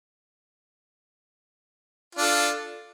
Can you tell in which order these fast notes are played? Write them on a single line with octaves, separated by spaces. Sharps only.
F4 D4 A4